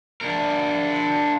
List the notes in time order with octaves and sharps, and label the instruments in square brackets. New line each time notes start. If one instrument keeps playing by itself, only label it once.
[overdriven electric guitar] D4 A#4